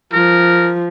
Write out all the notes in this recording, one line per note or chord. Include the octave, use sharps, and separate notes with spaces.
F3 A#4